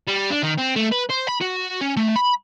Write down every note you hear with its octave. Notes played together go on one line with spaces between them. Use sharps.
G3
D4
D#3
C4
A3
B4
C5
B5
F#4
C#4
A3
B5